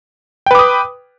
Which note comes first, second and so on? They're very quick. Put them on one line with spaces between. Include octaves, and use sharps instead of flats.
G5 B4 D6 D#6